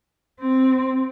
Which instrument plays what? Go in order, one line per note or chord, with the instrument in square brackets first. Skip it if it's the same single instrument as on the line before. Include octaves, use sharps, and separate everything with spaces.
[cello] C4